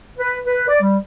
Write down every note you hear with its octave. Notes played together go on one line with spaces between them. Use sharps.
B4
B4
D5
G3